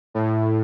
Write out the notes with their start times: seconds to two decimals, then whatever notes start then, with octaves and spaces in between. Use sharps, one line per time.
0.14 A2